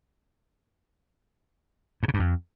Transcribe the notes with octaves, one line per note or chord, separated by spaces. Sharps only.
G2
C#3
G2
F2